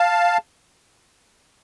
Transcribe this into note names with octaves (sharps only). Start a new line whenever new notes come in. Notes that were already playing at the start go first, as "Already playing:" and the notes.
Already playing: F5 A5